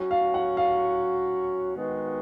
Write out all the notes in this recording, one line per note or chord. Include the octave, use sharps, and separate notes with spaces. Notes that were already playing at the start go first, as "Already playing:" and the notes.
Already playing: F#3 C#4 F#4
F5
F#5
F5
D#3 G#3 B3 F#4